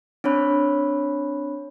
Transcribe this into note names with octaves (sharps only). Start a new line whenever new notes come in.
C4 D4 C#5 B5 F#6